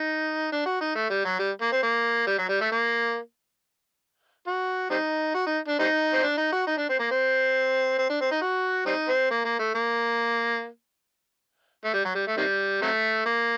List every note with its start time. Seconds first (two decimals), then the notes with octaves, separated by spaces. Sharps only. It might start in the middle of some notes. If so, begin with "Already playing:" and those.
Already playing: D#4
0.52 D4
0.66 F#4
0.81 D#4
0.95 A3
1.10 G3
1.25 F#3
1.39 G3
1.62 A#3
1.72 C4
1.83 A#3
2.27 G3
2.39 F#3
2.49 G3
2.61 A3
2.72 A#3
4.47 F#4
4.90 G3 C4 D#4
5.35 F#4
5.47 D#4
5.68 D4
5.79 G3 C4 D#4
6.13 C4
6.23 D4
6.37 D#4
6.52 F#4
6.67 D#4
6.77 D4
6.89 C4
6.99 A#3
7.11 C4
7.99 C4
8.10 D4
8.21 C4
8.31 D#4
8.42 F#4
8.86 G3 C4 D#4
9.08 C4
9.31 A#3
9.45 A#3
9.59 A3
9.75 A#3
11.85 A3
11.94 G3
12.05 F#3
12.15 G3
12.27 A3
12.37 C3 D#3 G3
12.82 C3 F#3 A3
13.26 A#3